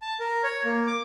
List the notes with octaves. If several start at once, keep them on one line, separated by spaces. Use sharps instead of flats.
A5
A#4
C#5
A#3
D6